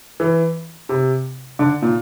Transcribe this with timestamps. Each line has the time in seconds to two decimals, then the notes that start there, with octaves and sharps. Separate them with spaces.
0.20 E3
0.89 C3
1.59 D3
1.82 A#2